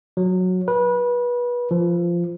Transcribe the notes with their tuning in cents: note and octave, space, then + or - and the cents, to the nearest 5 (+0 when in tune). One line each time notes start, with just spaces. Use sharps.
F#3 -10
B4 -25
F3 -15